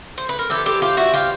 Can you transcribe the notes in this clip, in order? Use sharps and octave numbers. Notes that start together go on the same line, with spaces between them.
C5
B4
A#4
E3 G3 C4 G4 A4
G4 A4
F4 G4
E4 F#4
F4 G4